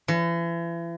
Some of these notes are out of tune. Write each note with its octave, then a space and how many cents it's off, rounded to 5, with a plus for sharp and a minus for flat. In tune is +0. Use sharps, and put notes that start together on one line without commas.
E3 +40